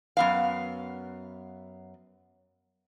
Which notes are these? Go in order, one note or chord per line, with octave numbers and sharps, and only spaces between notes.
F#2 B3 F5